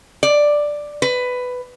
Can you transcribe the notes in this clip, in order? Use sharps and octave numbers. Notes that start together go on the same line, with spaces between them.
D5
B4